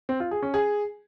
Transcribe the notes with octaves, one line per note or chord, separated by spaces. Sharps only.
C4
F4
G#4
C#4
G#4